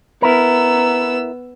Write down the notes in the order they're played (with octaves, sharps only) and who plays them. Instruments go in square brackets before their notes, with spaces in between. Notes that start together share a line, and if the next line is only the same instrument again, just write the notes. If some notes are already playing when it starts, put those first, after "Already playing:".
[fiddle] B3 E6 [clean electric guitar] E4 A#4